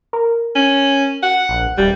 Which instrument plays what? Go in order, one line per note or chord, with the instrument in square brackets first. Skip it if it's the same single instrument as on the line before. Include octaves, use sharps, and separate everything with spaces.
[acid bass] A#4
[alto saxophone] C#4
F#5
[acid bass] A#1
[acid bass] D#1 [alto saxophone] G3